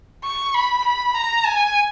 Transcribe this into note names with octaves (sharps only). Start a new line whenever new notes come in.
C#6
B5
B5
A#5
G#5